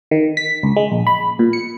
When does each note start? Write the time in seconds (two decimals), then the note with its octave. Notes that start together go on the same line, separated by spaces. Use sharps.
0.11 D#3
0.37 B6
0.63 C#2
0.76 G#3
0.92 A#1
1.07 B5
1.39 A#2
1.53 C#7